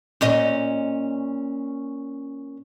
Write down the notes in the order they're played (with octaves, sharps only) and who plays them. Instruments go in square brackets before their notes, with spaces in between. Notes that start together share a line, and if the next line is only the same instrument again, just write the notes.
[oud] A#2 C#4 D#5